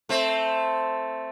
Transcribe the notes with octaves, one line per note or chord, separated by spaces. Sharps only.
A3 C4